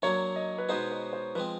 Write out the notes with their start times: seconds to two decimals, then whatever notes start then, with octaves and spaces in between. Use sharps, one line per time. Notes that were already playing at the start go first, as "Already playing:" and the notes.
0.02 F#3 A#3 D4 C#5
0.36 D#5
0.58 B4
0.69 B2 G#3 B3 D#4 C5
0.91 B4
1.13 C5
1.35 F3 G#3 C4 B4